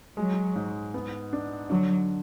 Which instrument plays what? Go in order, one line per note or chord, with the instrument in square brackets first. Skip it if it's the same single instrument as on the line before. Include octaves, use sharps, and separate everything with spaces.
[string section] F#3 [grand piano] G#3
[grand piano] G#2
B3
D4
[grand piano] D3 [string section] F#3